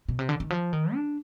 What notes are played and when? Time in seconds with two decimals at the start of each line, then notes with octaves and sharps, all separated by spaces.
0.09 B2
0.19 C3
0.29 D3
0.40 D#3
0.50 F3
0.73 D#3
0.94 D4